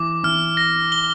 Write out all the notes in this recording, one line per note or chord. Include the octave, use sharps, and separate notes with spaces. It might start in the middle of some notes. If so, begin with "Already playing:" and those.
Already playing: E3 D6
E3 F6
A#6
G7